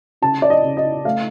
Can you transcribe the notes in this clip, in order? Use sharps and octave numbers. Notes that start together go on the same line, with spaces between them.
C#3 A5
D5
D#5
C#3
D#5
A3 F5